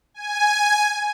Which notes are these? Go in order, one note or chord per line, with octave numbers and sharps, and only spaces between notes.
G#5